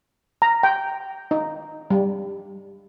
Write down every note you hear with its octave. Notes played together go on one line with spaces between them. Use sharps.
A#5
G5
D#4
G3